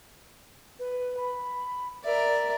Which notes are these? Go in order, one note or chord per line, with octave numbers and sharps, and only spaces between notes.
B4
B5
A#4 D5 E5